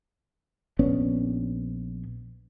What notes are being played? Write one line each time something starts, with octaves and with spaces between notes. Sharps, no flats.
A#1 B3 C#4 D4